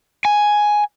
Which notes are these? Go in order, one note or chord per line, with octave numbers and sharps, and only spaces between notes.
G#5